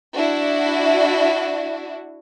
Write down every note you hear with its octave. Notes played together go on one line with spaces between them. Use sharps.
D4 E4 F#4